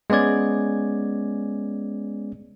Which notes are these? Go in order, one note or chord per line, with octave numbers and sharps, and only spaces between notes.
G#3 B3 C#4 D5 G#6